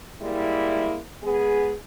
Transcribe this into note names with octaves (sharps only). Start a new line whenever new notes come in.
G3 G#3 A#3 E4
G#3 B3 G#4